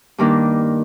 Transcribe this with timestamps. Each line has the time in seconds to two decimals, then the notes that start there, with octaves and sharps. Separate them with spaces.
0.18 G2 D#3 A#3 D4